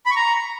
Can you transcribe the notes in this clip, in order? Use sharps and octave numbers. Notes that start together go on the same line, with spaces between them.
B5
C#6
A#5